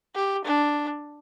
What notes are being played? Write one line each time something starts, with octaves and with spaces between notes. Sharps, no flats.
G4
D4